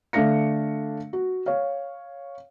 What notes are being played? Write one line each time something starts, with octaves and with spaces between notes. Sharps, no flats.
D3 A3 D4 F5 A#6 C#7
F#4
C#5 F5